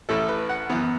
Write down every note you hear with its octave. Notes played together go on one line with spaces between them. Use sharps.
A1 A2 A3 E4 A4
B4
F#5
F#2 E3 B3